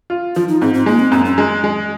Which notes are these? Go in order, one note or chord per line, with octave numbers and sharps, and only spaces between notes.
F4
F3 F4
D#4
G#2 C4
C4
G#3 A#3
C4
F#2 C4
C#4
G#3
G#3